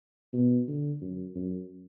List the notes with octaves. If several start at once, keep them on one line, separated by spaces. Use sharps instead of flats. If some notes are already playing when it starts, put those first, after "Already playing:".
B2
D3
F#2
F#2